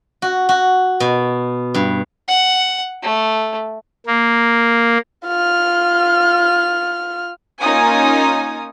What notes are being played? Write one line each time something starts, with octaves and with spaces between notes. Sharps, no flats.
F#4
F#4
B2
G2
F#5
A3
A#3
F4 F6
A#3 C#4 D#4 F4 G#5 D#6